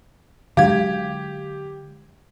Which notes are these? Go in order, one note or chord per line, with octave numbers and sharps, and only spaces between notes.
D3 F#3 G#3 G4 F5 G#6